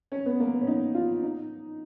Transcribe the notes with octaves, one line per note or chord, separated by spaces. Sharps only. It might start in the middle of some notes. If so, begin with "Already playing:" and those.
C#4
B3
A#3
B3
C#4
D#4
F4
D#4